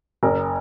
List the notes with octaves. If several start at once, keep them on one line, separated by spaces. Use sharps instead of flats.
F#1 A#4